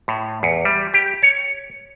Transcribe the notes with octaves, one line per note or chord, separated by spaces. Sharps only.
A2
E2
G3
G4
C#5